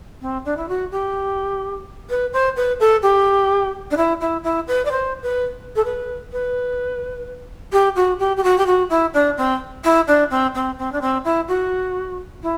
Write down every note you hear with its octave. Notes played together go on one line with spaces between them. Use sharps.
C4
D4
E4
F#4
G4
B4
C5
B4
A4
G4
D4
E4
E4
E4
B4
D5
C5
B4
A4
B4
B4
G4
F#4
G4
G4
F#4
G4
F#4
E4
D4
C4
E4
D4
C4
C4
C4
D4
C4
E4
F#4
E4